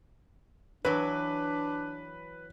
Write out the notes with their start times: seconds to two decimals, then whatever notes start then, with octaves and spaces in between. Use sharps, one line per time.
0.85 E3 F#3 D4 B4